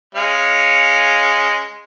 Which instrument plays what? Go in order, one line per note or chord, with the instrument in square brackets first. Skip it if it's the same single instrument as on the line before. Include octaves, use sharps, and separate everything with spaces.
[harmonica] G#3 C#4 F5